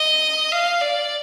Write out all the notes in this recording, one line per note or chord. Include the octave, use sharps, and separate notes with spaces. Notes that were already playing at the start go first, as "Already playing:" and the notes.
Already playing: D#5
F5
D5